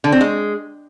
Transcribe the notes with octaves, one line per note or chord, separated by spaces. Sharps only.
D3
C4
G#3